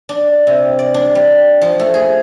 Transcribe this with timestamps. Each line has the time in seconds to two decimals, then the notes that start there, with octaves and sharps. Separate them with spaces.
0.09 D4
0.47 C3
0.79 D5
0.94 D4
1.15 G3
1.61 F3
1.79 A3
1.94 G#4